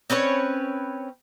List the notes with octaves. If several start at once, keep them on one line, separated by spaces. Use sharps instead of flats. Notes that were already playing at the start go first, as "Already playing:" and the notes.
C4 C#4 B4 C#5